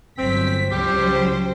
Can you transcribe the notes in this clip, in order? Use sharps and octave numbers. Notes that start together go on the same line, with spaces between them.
G1 F#3 C4 B6
C#2 F#3 G3 G4 C5